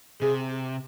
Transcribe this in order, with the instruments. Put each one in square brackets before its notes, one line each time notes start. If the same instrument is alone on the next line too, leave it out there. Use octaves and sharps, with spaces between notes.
[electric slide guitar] C3 [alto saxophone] G#4